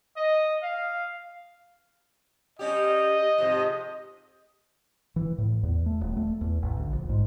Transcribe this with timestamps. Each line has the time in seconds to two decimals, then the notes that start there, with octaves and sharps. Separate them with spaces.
0.16 D#5
0.62 F5
2.59 G3 C#4 G4 D#5
3.38 G#2 C3 F3
5.16 E3
5.38 A2
5.63 E2
5.86 A3
6.01 D#1
6.17 A3
6.41 E2
6.62 A1
6.77 D2
6.93 A#1
7.09 G#2